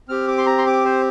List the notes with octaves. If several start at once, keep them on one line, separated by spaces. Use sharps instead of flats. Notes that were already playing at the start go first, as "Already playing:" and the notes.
C4 G4 F6
D6
C6
A#5
C6
D6
C5